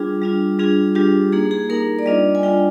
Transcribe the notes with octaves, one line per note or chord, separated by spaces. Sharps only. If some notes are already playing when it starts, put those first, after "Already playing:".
Already playing: G3 D4 F4 G#4
G3 D4 F4
G3 D4 F4 G#4
G3 D4 F4 G4
A#3 D#4 G#4
G#4
A#3 D#4 A#4
D5
G3 D4 F4 D#5
G#5
G3 D4 F4 G5